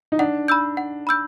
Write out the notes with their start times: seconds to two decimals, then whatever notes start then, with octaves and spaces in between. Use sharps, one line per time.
0.12 D#4
0.19 D4 F#5
0.48 B5 E6 G6
0.77 F#5
1.07 B5 E6 G6